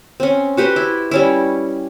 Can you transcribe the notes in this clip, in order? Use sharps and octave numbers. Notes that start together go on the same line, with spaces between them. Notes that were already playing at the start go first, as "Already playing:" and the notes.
C4 C#4
F#4 G4 B4 C5
E4
G3 C#4 E4